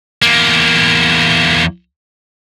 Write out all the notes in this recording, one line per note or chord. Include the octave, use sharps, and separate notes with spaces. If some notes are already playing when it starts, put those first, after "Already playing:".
E2 A#3